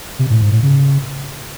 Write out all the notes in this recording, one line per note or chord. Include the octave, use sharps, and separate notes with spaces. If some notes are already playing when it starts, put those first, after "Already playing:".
C3
A2
G#2
A2
C#3